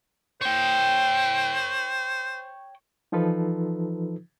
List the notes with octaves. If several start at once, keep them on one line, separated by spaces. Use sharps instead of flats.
C5 C#5 G5
E3 F3 D#4 F4 A4 B4